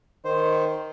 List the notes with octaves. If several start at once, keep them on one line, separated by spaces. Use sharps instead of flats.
D#3 C5